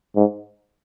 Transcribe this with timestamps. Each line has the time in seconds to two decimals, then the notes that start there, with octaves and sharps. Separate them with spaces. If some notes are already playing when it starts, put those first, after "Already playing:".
0.16 G#2